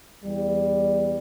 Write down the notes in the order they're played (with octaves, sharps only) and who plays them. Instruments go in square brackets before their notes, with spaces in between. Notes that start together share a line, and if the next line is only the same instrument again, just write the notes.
[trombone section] E2 G3